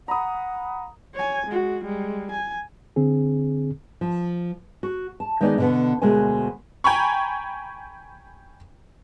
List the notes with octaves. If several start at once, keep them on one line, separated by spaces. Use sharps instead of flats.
F#5 A#5 B5 D#6
C#5 G#5
G#3 F#4
G3 G#3
G#5
D3 C4 G#4
F3
F#4
A5
D#3 G#3 B3 D#4 D5
B2 D3 B3
D2 B2 G#3 A#4 C5 G#5
G5 G#5 A#5 B5 C#6